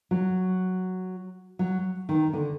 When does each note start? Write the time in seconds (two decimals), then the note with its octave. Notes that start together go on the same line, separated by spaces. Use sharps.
0.11 F#3
1.59 F#3
2.09 D#3
2.33 D3